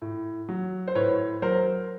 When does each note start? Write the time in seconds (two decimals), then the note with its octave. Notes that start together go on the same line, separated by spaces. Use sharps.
0.02 A2
0.49 F#3
0.88 C5
0.95 A2 B4 C#5
1.42 F#3 A#4 C5